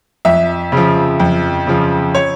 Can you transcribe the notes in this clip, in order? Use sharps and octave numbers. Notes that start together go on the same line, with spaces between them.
F2 E5
C#3 F3
F2
C#3 F3
C#5